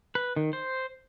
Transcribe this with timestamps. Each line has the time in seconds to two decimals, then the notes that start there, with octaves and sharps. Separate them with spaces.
0.15 B4
0.36 D#3
0.53 C5